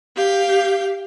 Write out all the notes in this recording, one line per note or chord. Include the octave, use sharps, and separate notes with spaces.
G4 F5 G6